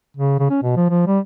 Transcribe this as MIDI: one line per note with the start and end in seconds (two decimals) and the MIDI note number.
0.17 0.37 49
0.39 0.47 49
0.50 0.63 61
0.63 0.74 47
0.76 0.88 53
0.90 1.03 53
1.07 1.19 55